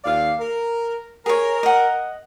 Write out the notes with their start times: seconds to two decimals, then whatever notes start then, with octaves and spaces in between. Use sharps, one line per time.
0.04 D#2 D5 F5
0.40 A#4
1.26 G#4 A#4 C#5
1.63 D#5 F#5